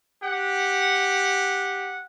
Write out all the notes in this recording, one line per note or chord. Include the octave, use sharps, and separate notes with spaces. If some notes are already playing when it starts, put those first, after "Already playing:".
G4 F#5